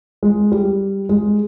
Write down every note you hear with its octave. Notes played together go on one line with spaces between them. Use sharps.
G#3
G3
G#3